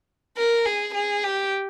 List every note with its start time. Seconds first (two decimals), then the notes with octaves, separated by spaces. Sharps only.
0.37 A#4
0.66 G#4
0.94 G#4
1.24 G4